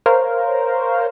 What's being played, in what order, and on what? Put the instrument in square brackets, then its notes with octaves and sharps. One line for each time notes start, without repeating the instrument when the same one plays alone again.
[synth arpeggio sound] A#4 C5 C#5 F5